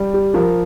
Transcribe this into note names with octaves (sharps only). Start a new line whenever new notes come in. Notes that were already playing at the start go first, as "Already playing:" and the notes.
Already playing: G3
G4
F3 A#4